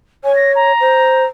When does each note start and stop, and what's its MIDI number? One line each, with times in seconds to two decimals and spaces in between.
0.24 0.72 73
0.24 0.35 80
0.36 0.52 94
0.55 1.26 82
0.81 1.24 72